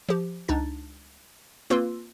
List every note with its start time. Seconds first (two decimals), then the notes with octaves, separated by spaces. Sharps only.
0.09 F3 G4
0.48 C#2 D4 D#4 A6
1.70 A#3 C4 F4 B4 C6 E6